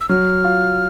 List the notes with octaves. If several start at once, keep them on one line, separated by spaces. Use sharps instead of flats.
E6
F#3 F6
F4